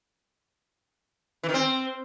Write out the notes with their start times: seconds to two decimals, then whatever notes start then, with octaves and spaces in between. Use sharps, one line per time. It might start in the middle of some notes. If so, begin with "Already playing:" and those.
1.43 E3
1.49 D#3
1.54 C4